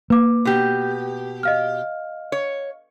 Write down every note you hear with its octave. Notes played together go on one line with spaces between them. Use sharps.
A#3 B4 D6
B2 G4
D#5 F5 F6
C#5